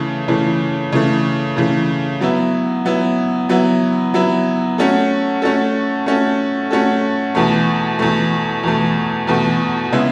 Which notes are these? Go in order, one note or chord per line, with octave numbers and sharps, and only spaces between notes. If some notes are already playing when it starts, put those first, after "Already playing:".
Already playing: C#3 E3 A3
C#3 E3 A3
C#3 E3 A3
C#3 E3 A3
F#3 B3 E4
F#3 B3 E4
F#3 B3 E4
F#3 B3 E4
A3 C#4 F#4 A4
A3 C#4 F#4 A4
A3 C#4 F#4 A4
A3 C#4 F#4 A4
E2 B2 A3
E2 B2 A3
E2 B2 A3
E2 B2 A3
C#3 G#3 B3 E4